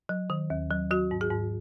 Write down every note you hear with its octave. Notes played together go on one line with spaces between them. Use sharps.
F#3
D#3
D#2
F#3
F#3 F#4
G#2
G#4
G#2